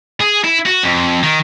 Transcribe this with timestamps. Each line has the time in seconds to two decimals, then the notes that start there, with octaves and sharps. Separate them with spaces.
0.21 G#4
0.44 E4
0.66 F#4
0.84 F2
1.23 D#3